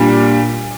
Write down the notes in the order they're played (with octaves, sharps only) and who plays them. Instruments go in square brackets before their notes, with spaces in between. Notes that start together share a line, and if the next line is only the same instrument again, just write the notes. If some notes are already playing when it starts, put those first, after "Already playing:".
Already playing: [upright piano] A#2 G3 D4